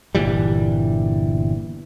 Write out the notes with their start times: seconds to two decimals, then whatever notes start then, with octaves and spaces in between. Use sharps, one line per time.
0.15 G1 A#2 E3 G3